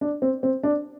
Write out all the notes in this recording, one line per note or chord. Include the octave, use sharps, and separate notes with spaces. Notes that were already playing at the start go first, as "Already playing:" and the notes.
D4
C4
C4
D4